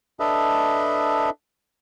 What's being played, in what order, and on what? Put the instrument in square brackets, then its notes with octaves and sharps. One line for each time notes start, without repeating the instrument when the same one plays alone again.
[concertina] D4 A4 B4 D#5 E5